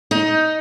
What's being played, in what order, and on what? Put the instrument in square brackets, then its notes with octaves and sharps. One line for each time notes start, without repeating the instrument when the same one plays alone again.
[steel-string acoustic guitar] D#4